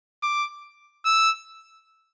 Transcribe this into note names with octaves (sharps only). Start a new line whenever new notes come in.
D6
E6